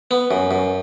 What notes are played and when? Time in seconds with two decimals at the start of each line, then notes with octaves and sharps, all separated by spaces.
0.11 B3
0.31 F#2
0.51 F#2